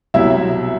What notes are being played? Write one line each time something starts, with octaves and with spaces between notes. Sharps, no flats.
C2 B2 F#3 E4 E5